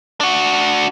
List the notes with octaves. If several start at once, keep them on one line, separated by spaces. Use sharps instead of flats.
D4 F#4